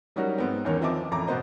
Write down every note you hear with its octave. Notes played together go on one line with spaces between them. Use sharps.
F#3 G3 C#4 D#4 F#4 A#4
G#2 B3 C4
E2 D#3 C#4 A#4 C#5
F3 C4 D#5 E5 A5 D6
A1 F2 A#5 D6
B2 B3 C5 D#5